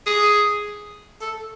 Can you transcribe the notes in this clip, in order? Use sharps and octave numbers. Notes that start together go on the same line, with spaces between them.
G#4
A4